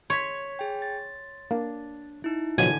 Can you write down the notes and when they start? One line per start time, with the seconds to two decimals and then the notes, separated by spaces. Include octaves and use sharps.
0.10 C#5 C6 G#6 B6
0.59 G#4 G5
0.82 A6
1.51 A#3 D4
2.24 D#4 E4
2.58 A1 B2 D3 F3 F#3 G#5